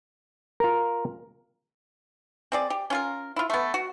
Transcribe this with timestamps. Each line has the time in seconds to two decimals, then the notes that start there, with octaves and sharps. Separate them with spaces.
0.60 F4 A#4
2.52 C4 G#4 D5
2.70 G4
2.90 C#4 F4 A#4
3.36 E4 F4
3.50 A3 B3
3.74 F#4